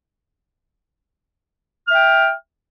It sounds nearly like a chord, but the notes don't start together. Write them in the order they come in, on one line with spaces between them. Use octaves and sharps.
F6 E5 G5